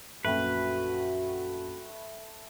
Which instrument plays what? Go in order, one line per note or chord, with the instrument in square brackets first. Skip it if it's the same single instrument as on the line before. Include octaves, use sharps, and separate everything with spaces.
[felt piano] A#1 F#2 [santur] A3 G5 B5 [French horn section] F#4 [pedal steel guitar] B4